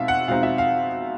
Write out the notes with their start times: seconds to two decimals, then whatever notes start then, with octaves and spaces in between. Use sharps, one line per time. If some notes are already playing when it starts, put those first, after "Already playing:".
Already playing: B2 G#3 C4 D#4 E5 F5
0.08 F#5
0.28 B2 G#3 C4 D#4 F5
0.43 E5
0.58 F5